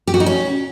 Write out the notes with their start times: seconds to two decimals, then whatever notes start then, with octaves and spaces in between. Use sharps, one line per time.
0.07 G4
0.14 F#4
0.20 D#4
0.26 C#4